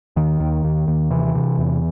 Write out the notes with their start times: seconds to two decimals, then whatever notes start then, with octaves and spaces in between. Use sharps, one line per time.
0.16 D#2 D#3
0.40 D#2
0.64 D#2
0.88 D#2
1.10 C3 E3
1.35 C3
1.58 E2